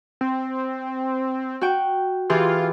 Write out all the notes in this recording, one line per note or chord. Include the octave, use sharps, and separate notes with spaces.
C4
F#4 G5
E3 F4 G4 G#4